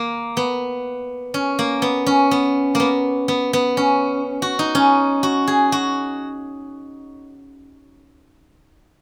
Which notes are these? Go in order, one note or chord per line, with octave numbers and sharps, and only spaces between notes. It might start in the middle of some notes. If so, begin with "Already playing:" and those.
Already playing: A#3
B3
C#4
A#3
B3
C#4
B3
A#3 B3
B3
B3
C#4
F#4
D#4
C#4
F#4
G#4
F#4